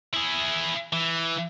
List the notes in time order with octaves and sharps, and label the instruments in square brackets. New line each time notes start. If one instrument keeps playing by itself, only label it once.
[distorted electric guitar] E4 G#4
E3